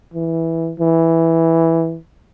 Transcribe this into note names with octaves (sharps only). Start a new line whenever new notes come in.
E3
E3